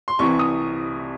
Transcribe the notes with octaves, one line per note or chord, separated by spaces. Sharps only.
C6
C2 C3 E3 C#6
D#6